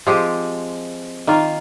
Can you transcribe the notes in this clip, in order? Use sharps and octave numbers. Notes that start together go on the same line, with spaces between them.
F3 G#3 C4 G4
D#3 A#3 F4